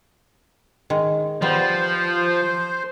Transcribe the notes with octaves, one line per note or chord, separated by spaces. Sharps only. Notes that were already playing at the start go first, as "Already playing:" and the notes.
D#3 G#3
F3 G3 B3 C5